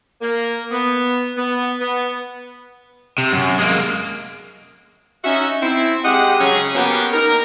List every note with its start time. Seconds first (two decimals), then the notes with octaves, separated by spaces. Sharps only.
0.21 A#3
0.71 B3
1.37 B3
1.80 B3
3.18 C3
3.32 F#2
3.59 G#3 A#3
5.24 C#4 D#4 F#4 E5
5.62 C4 E4
6.05 G#3 G4 D#5 F#5
6.41 C#3 F#3 C#4 G#4
6.75 A#3 B3 C#4 F#4 G4
7.13 D#4 A#4